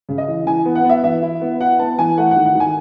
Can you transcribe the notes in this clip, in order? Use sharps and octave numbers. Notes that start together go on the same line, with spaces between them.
C#3
D#5
E3
E3 G#5
B3
F#5
B3 E5
E3 E5
E4
B3
E4 F#5
B3 A5
E3 G#5
A3 F#5
F#5
D#3
F#5
D#3 G#5